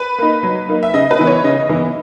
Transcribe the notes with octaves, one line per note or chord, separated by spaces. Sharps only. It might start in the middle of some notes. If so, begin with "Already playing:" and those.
Already playing: B4
A#3 D#4
F#3
A#3 D#4
E5
C#3 D#5
B4
E3 B3 E4
C#5
C#3 D#5
E3 B3 E4